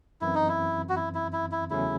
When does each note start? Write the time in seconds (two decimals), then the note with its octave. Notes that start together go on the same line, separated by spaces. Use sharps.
0.21 F#2 E3 C4 E4
0.35 D#4
0.48 E4
0.89 F#4
0.96 E4
1.15 E4
1.33 E4
1.51 E4
1.70 E2 C#3 F#3 A3 C#4 E4